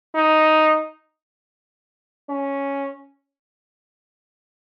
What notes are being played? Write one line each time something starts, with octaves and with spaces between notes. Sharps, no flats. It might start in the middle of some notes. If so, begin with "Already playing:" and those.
D#4
C#4